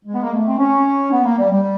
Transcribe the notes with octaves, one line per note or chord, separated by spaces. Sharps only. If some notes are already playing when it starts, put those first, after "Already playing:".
G#3
B3
A#3
A3
C4
C#4
B3
A#3
G3
G3